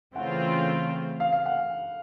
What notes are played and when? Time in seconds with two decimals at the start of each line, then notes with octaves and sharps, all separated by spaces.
0.16 C#3 E3 A3 C4 F4 F#5
1.20 F5
1.33 F5
1.46 F#5